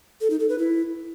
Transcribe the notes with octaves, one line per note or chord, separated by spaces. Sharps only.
A4
D#4
A4
B4
E4